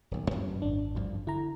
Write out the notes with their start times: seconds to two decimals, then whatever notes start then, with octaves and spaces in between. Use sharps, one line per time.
0.11 D#1 B1
0.31 F#2 C#4
0.62 G#1 D4
0.95 D2 G2 F3
1.27 D3 E4 A#5